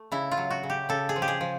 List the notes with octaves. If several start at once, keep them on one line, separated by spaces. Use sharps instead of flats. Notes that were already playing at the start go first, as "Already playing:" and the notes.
Already playing: A3
C#3 E4
F4
F#3
F#4
C#3
G4
C#3 A4
G#4
F3
G4
G#4
F3